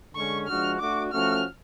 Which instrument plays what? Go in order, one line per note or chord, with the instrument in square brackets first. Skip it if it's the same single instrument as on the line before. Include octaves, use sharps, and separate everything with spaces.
[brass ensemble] D3 G#3 C#4 [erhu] C#6
[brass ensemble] F3 G#3 D4 F#4 [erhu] F6
[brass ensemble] A3 D4 F#4 [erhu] D6
[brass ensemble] F3 A3 C#4 F#4 [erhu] F6